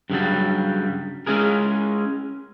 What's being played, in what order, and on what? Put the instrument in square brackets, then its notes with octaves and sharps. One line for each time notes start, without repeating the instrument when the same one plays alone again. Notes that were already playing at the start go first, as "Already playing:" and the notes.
[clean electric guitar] G2 C#3 E3 F#3 G3
G#3 C#4 E4 G#4 A#4